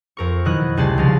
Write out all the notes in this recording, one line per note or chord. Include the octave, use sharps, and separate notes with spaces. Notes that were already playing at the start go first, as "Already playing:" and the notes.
F2 A#4 C#6
B2 D#3 F#3 E4 D#5 F#6
C#2 C3 G3 C#4 A5 C7
C2 C#3 F3 D#5 F5 A6